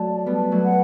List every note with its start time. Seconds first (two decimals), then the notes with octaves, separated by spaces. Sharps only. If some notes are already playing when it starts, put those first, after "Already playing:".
Already playing: F#3 A3 D5 A5
0.26 G3 B3 B4
0.52 F#3 A3
0.64 F#5